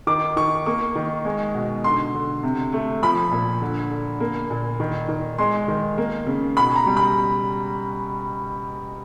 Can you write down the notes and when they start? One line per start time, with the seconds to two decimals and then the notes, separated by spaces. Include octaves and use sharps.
0.07 D#3 D6
0.37 D#3 C#6
0.66 A#3 C#6
0.95 D#3
1.25 G#3
1.54 B2
1.84 D3 C6
2.14 D3
2.43 C3
2.73 A3
3.03 F3 B5
3.31 A#2
3.62 D3
3.91 D3
4.20 A#3
4.50 A#2
4.80 D#3
5.09 D#3
5.38 G#3 C6
5.68 D#3
5.98 A#3
6.27 C#3
6.57 B2 B5
6.76 A#5
6.87 G3
6.97 B5